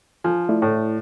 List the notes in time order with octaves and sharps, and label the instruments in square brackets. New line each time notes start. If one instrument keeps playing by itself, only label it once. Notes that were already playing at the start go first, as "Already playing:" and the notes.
[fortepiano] F3 [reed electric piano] G#5
[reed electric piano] A3 E4 D5
[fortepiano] A2